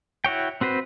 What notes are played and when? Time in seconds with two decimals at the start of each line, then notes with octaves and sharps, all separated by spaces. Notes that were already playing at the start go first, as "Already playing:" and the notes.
0.25 E4 F#4 C#5 G5
0.61 C4 F#4 B4 C5